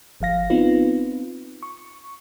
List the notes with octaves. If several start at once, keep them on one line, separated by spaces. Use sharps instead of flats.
G1 F3 F5 A#6
B3 C4 D#4 F4 B4
C#6